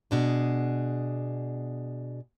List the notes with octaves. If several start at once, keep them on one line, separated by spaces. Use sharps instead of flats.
B2 D4 G#4